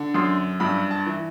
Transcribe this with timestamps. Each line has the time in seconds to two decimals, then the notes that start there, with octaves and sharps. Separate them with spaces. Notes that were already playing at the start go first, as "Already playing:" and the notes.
Already playing: D3
0.14 F#2 C6
0.60 G2 B5
0.91 A5
1.06 E3